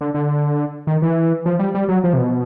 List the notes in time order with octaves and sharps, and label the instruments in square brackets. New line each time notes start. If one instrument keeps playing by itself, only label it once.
[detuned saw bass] D3
D3
D#3
E3
F3
G3
G3
F#3
F3
C3
B2